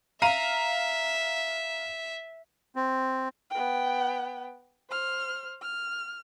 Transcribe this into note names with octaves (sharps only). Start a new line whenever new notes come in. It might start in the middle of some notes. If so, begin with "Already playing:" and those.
E5 F5 A#5 D#7
C4
B3 G5
C5 F6
F6